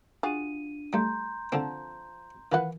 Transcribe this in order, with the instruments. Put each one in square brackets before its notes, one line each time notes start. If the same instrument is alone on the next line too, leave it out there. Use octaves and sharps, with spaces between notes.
[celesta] D4 D#7 [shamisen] F4 F#4 G#4
[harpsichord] G3 A3 [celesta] A#5 C6 G6
[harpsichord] D3 C4 [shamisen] F3 A4 A5
[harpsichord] D#3 E3 [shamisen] F4 B4 F#5